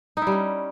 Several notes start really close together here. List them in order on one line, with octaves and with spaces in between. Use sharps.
D#4 E4 G3 C#4